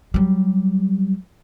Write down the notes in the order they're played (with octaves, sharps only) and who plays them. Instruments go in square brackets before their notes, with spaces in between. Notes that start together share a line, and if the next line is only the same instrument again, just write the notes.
[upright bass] F#3 G3